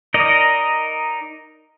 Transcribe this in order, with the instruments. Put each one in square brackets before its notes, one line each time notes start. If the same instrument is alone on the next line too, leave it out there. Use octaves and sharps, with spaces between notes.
[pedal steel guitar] D#4 A#4 D5 D#5